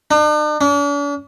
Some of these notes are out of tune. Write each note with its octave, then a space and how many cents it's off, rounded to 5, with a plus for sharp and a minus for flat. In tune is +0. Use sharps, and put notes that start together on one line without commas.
D4 +45
D4 -45